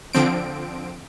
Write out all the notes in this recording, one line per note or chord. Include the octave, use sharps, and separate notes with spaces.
D3 F3 C4 D7